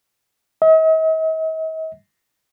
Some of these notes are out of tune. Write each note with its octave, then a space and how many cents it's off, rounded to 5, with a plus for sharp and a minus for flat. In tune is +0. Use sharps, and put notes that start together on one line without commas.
D#5 +45